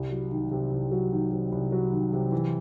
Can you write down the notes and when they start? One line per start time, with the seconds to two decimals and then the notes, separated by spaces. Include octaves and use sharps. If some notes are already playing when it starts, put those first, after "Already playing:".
Already playing: C2
0.11 F#3
0.32 D#3
0.51 C3
0.71 C2
0.92 F#3
1.12 D#3
1.32 C3
1.52 C2
1.72 F#3
1.93 D#3
2.13 C3
2.32 E3